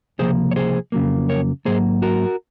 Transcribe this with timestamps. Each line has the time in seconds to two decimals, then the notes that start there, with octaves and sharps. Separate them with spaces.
0.19 C#2 C3 F3 A#3 G#4 C5
0.51 C#5
0.56 G#4 C5
0.92 F2 C#3 F#3 A#3
1.29 A#4 C#5
1.65 G#2 F#3 A#3 G#4 C5
2.02 F#4 A#4